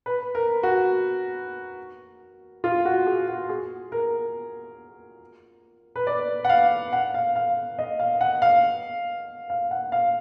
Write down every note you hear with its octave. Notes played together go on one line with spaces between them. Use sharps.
B4
A#4
F#4
F4
F#4
G#4
F#4
G#4
A#4
B4
D5
F#5
F5
F#5
F5
F5
D#5
F5
F#5
F5
F5
F#5
F5